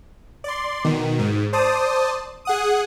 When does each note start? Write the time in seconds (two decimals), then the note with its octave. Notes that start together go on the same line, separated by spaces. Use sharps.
0.44 D5 C6
0.84 B2 D#3
1.19 G#2
1.53 C5 D5 A5 D#6
2.45 G#4 F#5 D#6